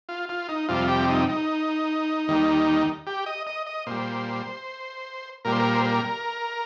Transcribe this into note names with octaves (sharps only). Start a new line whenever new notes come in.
F4
F4
D#4
F2 C3 G3 F4
G4
D#4
D#4
D#2 D#3 G3
G4
D#5
D#5
D#5
A#2 G3 C5
A#2 G3 A#4
C5
A#4
C5
A#4